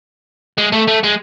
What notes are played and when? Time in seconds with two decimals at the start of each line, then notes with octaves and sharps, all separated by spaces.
0.58 G#3
0.73 A3
0.88 A3
1.04 G#3